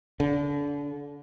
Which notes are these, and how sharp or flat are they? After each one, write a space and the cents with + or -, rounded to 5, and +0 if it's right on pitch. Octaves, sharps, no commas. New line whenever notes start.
D3 -30